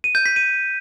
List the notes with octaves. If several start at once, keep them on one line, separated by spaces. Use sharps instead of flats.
D#7
G6
B6
D#7